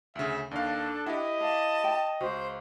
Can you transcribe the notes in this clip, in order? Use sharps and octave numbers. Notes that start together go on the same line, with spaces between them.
D2 C#3 E5
D#2 D4 A4 F5
E4 G4 D#5 F#5
F5 A5
G5
C#2 F#4 C5